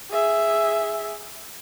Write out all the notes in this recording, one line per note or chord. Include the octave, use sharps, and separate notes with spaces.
G#4 E5